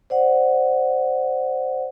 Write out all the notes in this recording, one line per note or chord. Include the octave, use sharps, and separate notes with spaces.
C5 D5 F#5